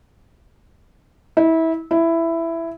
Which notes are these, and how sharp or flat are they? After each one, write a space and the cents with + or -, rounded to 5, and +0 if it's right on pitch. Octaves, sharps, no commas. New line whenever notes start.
E4 -25
E4 +10